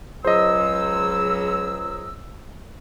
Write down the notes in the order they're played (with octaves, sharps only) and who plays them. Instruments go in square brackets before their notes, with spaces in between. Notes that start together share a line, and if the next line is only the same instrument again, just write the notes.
[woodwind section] C#2 F#3 E6 [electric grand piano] C5 D#5